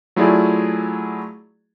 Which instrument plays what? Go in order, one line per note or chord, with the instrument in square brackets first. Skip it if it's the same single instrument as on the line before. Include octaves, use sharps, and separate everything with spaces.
[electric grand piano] F#3 A3 E4 F4 G#4 D5